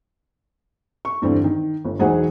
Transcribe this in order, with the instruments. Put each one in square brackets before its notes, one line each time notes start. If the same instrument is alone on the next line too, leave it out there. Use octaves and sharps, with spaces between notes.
[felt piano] C#6
E2 G2 D3 E3 C4
D#3
G1
E1 F#3 D#4 G#4 C5 F#5